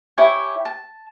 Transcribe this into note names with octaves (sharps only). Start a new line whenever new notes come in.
E4 G4 C#5 G#5
A5